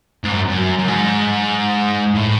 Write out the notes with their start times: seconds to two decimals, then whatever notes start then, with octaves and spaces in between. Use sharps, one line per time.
0.24 G#2
0.32 F#2
0.48 F#2
0.79 F#2
0.88 G#2
2.15 A2